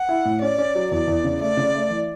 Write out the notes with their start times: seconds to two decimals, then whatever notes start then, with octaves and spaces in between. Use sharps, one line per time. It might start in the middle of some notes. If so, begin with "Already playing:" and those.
Already playing: F#5
0.09 E4
0.25 A2
0.42 C#4 D5
0.58 C#4
0.75 F#3
0.91 E2 D5
1.07 E2
1.24 C#3
1.41 A3 D5
1.57 C#3
1.75 A3
1.90 E3